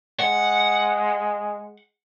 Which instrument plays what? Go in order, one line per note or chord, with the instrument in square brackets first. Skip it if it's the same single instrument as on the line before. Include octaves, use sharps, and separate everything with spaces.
[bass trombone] G#3 [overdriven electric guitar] F#5